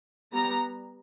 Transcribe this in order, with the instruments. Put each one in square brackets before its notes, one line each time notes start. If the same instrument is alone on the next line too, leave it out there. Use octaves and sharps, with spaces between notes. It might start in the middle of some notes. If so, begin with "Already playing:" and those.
[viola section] G3 B3 A#5